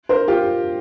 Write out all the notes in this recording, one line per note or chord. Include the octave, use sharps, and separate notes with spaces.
A#4 C5
F4 G4